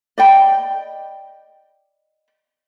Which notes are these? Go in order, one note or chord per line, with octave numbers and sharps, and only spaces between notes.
D5 D#5 G5 B5